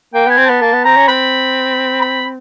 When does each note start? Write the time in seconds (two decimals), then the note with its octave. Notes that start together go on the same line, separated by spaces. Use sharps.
0.14 A#3 G5
0.26 B3 G#5
0.38 C4
0.46 B3 A5
0.61 A#3 A5
0.73 B3
0.85 C4 A#5
0.97 C#4
1.08 C4 B5
2.01 B5